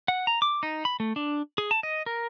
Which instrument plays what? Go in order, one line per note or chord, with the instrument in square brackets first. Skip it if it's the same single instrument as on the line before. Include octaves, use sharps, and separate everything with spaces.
[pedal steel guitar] F#5
A#5
D6
D#4
B5
A3
D4
G#4
A5
D#5
A#4